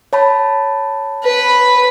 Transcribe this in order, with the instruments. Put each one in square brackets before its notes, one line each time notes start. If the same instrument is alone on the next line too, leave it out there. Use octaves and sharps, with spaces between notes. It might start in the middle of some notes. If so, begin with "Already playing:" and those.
[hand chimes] C#5 A5 B5
[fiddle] B4